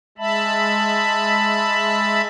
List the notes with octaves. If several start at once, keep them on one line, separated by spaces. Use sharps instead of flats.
G#3 E5 A5 B5